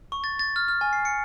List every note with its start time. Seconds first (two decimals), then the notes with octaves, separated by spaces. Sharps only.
0.12 C#6
0.24 A6
0.39 A6
0.56 F6
0.68 F6
0.81 G#5
0.93 C7
1.05 C#7